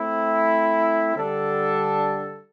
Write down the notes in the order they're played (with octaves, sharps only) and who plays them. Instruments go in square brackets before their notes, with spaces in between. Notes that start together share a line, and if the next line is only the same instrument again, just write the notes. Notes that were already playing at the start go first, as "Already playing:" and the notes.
Already playing: [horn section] A3 C4 E4
D3 G3 D4 A4